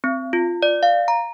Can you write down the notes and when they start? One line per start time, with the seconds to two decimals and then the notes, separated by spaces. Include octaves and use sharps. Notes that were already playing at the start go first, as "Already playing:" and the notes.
0.04 C4
0.33 F4
0.63 D5
0.83 F5
1.08 A#5